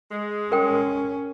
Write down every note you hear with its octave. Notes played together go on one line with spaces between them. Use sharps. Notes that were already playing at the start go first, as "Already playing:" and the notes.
G#3
C#4 A#4 G5